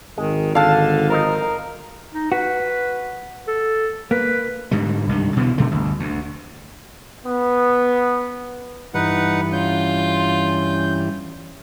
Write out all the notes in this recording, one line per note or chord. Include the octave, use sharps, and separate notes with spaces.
G#1 D#3 G#3
D3 D4 A4 F5 A5
F3 D#4 A#4 D#5
D#4
F#4 B4
A4
A#3 B4
G#2 D3 G3
C2 G2 D#3
B2 D3 E3
B2 D3 G3 A3
G1 D2
D2
B3
G2 E3 D#4 B4 F#5
C#4 F4 G6